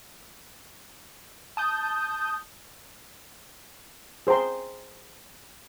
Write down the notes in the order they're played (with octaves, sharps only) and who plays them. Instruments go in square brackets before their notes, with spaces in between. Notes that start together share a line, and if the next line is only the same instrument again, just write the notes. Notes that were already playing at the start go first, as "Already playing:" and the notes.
[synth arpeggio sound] A5 D#6 G6
[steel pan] G#4 C5 G5 A#5 C6